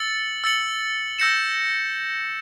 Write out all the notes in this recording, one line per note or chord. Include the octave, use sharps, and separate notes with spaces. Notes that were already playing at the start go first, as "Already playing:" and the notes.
Already playing: E6 A6 C#7 F#7
E6 A6 C#7 F#7
E6 G6 A#6 C#7 E7